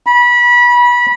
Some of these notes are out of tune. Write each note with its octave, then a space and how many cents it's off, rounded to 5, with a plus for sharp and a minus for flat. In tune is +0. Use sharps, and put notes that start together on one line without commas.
B5 -25